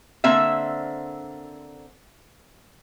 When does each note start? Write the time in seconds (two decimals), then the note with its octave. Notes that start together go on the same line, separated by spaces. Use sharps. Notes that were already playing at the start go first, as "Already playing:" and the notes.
0.24 D3 A#3 C4 E5